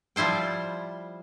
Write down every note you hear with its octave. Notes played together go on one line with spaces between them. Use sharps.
F3 G3 E4 C5 G5